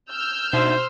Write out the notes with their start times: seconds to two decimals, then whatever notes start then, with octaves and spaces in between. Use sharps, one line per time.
0.11 E6 F6 G6
0.53 B2 D4 D#4 C5 E5